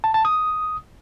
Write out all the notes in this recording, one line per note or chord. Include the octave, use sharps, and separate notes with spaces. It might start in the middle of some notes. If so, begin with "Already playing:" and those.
A5
A5
D#6